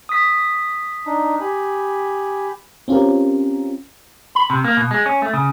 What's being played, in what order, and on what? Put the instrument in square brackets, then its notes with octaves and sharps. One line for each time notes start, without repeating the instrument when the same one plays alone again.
[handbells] D#6 B6
[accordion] D4 D#4
G4 G#5 B5
[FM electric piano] C4 C#4 F4 G4 A#4
[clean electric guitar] B5
C3
A#3
B2
G#3
C#4
A3
C#3